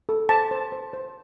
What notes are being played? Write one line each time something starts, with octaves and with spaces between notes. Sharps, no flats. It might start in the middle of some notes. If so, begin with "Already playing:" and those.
A4
C5 A5
C5
C5
C5